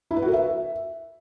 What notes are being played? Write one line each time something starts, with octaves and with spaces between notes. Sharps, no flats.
E4
B4
F#4
A#4
E5